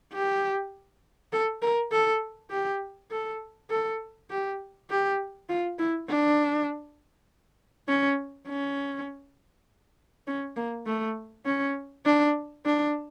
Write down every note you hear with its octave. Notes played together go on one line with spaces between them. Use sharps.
G4
A4
A#4
A4
G4
A4
A4
G4
G4
F4
E4
D4
C#4
C#4
C#4
A#3
A3
C#4
D4
D4